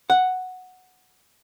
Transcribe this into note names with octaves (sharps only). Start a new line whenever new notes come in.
F#5